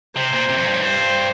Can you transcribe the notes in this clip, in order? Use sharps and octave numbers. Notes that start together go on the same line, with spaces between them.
C3 C5
A#2
C3
F2
G2
A2
G2 C5